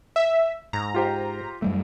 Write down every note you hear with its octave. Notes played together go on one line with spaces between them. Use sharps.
E5
G#2 A#5
F4 G4 C5
F#2 G3 A3